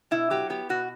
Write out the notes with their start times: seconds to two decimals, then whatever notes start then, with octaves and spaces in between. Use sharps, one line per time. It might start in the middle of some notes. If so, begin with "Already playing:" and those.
0.11 B2 E4
0.30 F#3 G4
0.50 B3 G4
0.69 B2 F#4